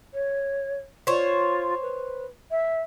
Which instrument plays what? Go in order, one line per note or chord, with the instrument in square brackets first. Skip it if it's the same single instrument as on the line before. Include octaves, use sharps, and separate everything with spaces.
[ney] C#5
[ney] F4 [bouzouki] C5 C#5
[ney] B4
E5